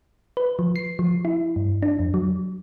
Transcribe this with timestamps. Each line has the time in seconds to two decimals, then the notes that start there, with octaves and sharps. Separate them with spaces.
0.37 B4
0.59 F3
0.76 C7
0.99 F3
1.25 E4
1.56 G2
1.82 D4
1.99 F2
2.14 F#3